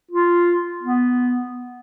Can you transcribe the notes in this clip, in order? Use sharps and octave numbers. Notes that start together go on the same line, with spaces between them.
F4
B3